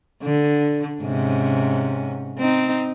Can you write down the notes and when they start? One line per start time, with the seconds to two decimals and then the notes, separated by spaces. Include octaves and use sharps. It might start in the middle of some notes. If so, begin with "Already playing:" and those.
0.23 D3
1.03 G#2 C3 C#4
2.39 C4 D#4